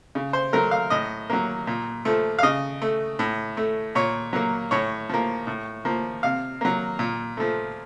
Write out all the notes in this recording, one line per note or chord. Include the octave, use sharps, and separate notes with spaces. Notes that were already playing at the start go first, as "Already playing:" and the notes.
C#3
C5
F#3 A3 A#4
F5
A2 D#5
F#3 A#3
A#2
F3 A3
F5
C#3 D#5
A3
A2
A3
A#2 C#5
F#3 A#3
A2 C#5
F3 A#3
A2
F3 A#3
C3 F5
F#3 A#3
A#2
F3 A3